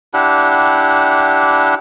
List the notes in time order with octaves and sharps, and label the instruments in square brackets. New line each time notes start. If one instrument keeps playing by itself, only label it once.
[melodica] D4 E4 G4 F#5